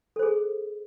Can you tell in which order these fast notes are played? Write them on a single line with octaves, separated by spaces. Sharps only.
A4 C5 G#4